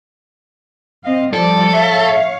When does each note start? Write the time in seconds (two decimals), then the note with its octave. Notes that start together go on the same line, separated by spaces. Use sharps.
1.04 C4 D#5 F5
1.33 F3 G3 A4 D5
1.73 C#5 E5 F5